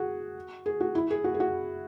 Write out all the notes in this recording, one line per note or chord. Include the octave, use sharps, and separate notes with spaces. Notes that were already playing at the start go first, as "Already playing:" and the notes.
Already playing: F#4 G#4
G#4
F#4
E4
G#4
F#4
G#4
F#4